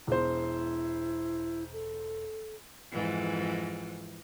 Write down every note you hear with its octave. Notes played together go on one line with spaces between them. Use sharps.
E1 E4 C5
A4
F2 G#2 E3